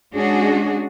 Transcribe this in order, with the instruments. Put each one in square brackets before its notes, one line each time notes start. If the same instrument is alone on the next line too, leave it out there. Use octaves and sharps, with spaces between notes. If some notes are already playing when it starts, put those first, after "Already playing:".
[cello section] G#3 C#4 D4 F#4 G#4